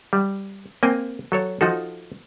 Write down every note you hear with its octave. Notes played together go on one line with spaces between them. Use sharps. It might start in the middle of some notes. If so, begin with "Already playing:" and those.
G3
A#3 C4 G5 G#5
F#3 A4 C#5
F3 D#4 F#4 A4